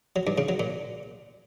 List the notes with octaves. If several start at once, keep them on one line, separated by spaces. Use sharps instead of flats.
F#3
G2
C#3
F#3
A#2